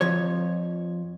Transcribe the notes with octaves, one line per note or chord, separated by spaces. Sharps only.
F2 F3 C#5